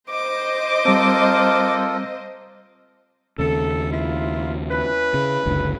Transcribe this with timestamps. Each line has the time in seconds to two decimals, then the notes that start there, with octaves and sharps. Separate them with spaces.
0.10 C5 D#5 D6
0.85 G3 C4 F4 A4 A#4
3.39 D#2 C#3 A4
3.91 A#3 E4 F4
4.70 C#4 E4 B4
5.14 C#3
5.46 F#1 C#2 D3